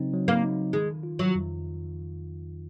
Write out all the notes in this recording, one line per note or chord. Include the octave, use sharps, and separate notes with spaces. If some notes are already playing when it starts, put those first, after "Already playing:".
Already playing: C#3 F#3 C4 D#4
F#3
A#3
D#4
D#3 G#3
F4
F#3
F2